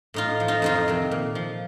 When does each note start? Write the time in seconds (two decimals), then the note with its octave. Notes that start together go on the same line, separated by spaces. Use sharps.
0.14 A2 D#4 F4
0.40 F3
0.48 D#4 F4
0.62 F2 D#4 F4
0.88 C3 D#3
1.11 A#2
1.35 F3